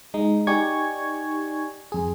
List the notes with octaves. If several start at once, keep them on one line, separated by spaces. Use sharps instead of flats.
G#3 D#4
D#4 G4 D5 G#5 C#6 G#6
F2 G#4